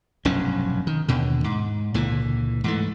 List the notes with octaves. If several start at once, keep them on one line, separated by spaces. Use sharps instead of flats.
F1 B1 G2 C#4
D#3
D#2 B2 D3
G#2
C#2 A#2 D3 E3
G#2 E3 A3